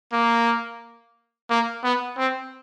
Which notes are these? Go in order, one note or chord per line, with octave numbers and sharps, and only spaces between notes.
A#3
A#3
B3
C4